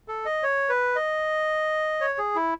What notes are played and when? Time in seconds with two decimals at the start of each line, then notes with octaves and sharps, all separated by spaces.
0.08 A4
0.26 D#5
0.43 C#5
0.69 B4
0.96 D#5
2.01 C#5
2.18 G#4
2.36 E4